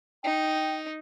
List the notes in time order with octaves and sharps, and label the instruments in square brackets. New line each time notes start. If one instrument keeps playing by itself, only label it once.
[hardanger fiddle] D#4 [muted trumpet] G5